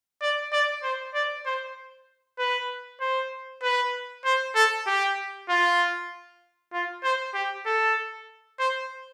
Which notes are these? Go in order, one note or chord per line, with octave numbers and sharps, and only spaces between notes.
D5
D5
C5
D5
C5
B4
C5
B4
C5
A4
G4
F4
F4
C5
G4
A4
C5